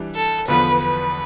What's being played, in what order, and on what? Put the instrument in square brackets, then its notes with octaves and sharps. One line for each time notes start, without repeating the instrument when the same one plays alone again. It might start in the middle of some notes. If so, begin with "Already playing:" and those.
Already playing: [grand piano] E3 G3 D4
[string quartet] A4
[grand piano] E2 D3 F3 B3 [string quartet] B4
[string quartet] B4